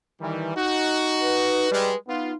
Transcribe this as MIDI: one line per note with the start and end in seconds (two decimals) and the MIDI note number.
0.20 0.55 51
0.20 0.55 52
0.20 0.55 55
0.55 1.70 63
0.55 1.70 66
1.21 1.96 71
1.71 1.93 55
1.71 1.93 56
2.08 2.32 59
2.08 2.35 63
2.08 2.32 65